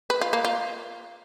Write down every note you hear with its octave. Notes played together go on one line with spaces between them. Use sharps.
B4
F4
A#3
F4